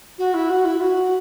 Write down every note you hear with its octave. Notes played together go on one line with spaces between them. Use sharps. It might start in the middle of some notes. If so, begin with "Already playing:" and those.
F#4
E4
F#4
E4
F#4